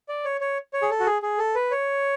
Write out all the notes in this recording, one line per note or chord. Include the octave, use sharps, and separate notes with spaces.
D5
C#5
C#5
C#5
G#4
A4
F#4
G#4
G#4
A4
B4
C#5